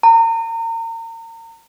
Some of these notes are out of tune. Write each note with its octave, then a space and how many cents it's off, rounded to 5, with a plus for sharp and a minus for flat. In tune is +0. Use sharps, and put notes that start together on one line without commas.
A#5 -35